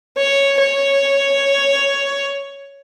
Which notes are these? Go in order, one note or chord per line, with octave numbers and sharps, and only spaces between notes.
C#5
C#5